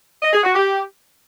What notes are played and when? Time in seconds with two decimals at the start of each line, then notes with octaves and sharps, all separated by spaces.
0.22 D#5
0.33 G#4
0.44 F#4
0.55 G4